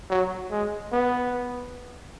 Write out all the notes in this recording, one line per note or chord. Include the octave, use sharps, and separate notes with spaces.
F#3
G#3
B3